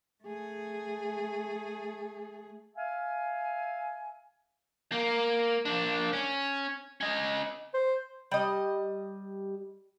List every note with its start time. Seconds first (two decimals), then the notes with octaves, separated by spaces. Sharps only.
0.24 A3 G#4
2.75 E5 F5 G#5
4.92 A#3
5.65 A#3 D4
6.13 C#4
7.01 C#4 D#5
7.74 C5
8.31 G3 D#5